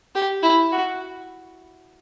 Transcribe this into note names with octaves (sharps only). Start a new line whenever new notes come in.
G4
E4
F#4